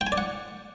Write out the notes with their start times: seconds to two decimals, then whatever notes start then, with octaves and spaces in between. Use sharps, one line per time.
0.01 G5
0.07 G#5
0.12 D5
0.18 F#5